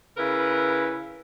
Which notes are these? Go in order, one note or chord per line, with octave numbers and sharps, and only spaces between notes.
C#3 E4 A#4 B4